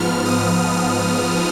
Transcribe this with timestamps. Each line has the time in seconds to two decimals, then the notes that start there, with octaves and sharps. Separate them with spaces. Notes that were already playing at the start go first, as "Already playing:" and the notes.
Already playing: G#2 F3 B3 F6
0.25 D#6